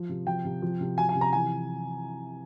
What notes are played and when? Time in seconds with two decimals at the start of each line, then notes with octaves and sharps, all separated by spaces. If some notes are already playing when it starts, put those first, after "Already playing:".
Already playing: F3
0.09 C3
0.27 F3 G5
0.45 C3
0.62 F3
0.80 C3
0.98 F3 G#5
1.09 G#5
1.15 C3
1.21 A#5
1.33 E3 G#5